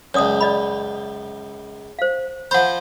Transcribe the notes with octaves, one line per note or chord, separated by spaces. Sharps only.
C#2 F#2 C#5 D5 D#6
D5 D#5 B5
C5 F5
F3 C5 F#5 B5